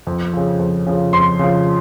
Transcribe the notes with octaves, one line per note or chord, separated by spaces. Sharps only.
F2
C#3 F3
F2
C#3 F3
F2 C6
C#3 F3